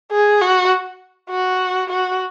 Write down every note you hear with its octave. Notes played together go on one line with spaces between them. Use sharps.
G#4
F#4
F#4
F#4